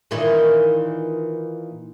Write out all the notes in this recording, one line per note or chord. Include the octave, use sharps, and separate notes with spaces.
A#2 D#3 E3